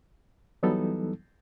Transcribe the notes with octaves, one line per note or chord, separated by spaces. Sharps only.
E3 F#3 G3 B3 D#4 A4